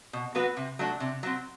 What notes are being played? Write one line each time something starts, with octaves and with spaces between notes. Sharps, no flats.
B2
F#3 B3 F#4 B4
C3
F#3 A3 D4
C3
F#3 C4